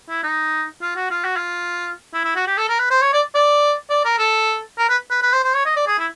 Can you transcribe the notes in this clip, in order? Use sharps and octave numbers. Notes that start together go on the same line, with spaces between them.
E4
D#4
F4
F#4
F4
F#4
F4
E4
E4
F#4
G4
A4
A#4
B4
C5
C#5
D5
D5
D5
A#4
A4
A#4
B4
B4
B4
C5
C5
C#5
D#5
D5
G#4
E4